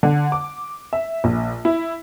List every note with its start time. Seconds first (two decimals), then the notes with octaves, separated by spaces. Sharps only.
0.03 D3
0.32 D6
0.93 E5
1.24 A#1
1.65 E4